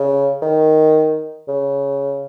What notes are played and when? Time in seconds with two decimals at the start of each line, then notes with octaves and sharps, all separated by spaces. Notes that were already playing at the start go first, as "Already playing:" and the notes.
Already playing: C#3
0.42 D#3
1.48 C#3